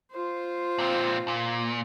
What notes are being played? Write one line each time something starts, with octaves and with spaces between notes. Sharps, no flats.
F4 C5
A#2 C4
A#2